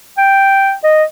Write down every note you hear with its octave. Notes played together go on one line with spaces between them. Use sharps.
G5
D#5